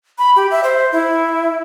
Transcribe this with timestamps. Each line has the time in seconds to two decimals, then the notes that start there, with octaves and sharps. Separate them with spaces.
0.18 B5
0.36 G4
0.51 E5
0.64 C5
0.92 E4